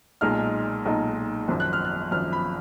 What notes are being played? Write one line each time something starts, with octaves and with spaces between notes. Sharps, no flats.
B1 A#2 G#3 D#4 F6
B1 A#2 G#3 D#4
G#1 F#2 F3
F#6
F6
F#6
G#1 F#2 F3 F6
B5